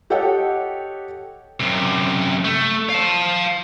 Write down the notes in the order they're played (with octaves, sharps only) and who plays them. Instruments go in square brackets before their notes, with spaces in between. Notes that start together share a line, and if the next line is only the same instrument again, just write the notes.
[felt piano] G4 A4 C#5 D#5 F#5 G5
[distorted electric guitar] F#2 C3
A3
F5 A5